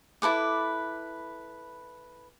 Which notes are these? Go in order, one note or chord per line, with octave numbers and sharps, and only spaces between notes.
E4 A4 B4 D6